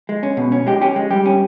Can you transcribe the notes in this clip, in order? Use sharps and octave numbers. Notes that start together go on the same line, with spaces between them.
G#3
C#4
B2
C#4
G#3 G4
C#4 G4
G#3
G3 G4
C#4